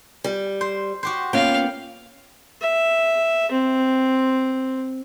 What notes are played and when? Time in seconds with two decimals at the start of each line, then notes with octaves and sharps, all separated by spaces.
0.24 G3
0.61 C5
1.03 F#4 G4 C5
1.33 A#3 B3 C#4 F4 F5 G5
2.61 E5
3.51 C4